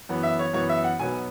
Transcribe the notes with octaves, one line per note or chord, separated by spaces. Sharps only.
F#2 E3 B3
E5
C#5
F#2 E3 B3 C#5
E5
F#5
B1 B2 F#3 B3 G#5